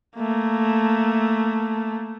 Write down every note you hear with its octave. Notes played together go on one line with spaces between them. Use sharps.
A3 A#3